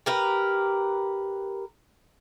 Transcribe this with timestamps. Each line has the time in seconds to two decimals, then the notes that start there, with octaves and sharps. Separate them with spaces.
0.06 G4 A#4 B4